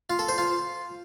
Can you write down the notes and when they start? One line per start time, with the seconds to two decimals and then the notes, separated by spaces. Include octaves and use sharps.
0.10 F4
0.19 A4
0.29 C5
0.38 F4